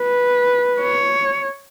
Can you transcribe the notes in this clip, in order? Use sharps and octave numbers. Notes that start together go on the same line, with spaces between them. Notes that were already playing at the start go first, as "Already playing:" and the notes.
Already playing: B4
C#5